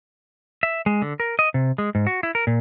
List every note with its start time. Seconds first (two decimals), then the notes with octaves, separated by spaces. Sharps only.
0.63 E5
0.86 G#3
1.02 D3
1.20 A#4
1.39 D#5
1.54 C3
1.78 G#3
1.95 G#2
2.07 F#4
2.23 E4
2.35 A#4
2.47 A#2